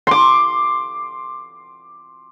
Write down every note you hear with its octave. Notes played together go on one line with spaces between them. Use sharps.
C6 D6